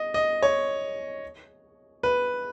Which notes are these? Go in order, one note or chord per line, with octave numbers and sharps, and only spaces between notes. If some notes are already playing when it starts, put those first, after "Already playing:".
Already playing: D#5
D#5
C#5
B4